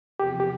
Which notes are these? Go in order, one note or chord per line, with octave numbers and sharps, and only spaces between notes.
E2 C3 F3 G4
G4